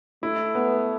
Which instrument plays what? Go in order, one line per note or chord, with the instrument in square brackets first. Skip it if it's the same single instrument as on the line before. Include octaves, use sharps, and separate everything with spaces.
[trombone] A3 [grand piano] E4
[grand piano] B3